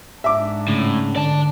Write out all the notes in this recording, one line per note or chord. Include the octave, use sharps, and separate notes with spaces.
G#2 D4 E5 D6
A2 C#3
D3 D5 A5